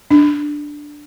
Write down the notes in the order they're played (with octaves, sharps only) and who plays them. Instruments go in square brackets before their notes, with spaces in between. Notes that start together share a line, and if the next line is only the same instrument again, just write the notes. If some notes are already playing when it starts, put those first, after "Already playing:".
[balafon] D4